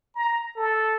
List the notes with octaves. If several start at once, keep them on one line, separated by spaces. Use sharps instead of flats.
A#5
A4